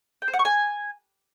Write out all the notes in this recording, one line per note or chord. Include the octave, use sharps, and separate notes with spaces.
G5
C5
F#5
C#6
G#5